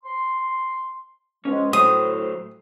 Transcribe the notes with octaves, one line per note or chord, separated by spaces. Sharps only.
C6
C#2 F3 G#3 C#4
A2 F#3 A3 C5 D#6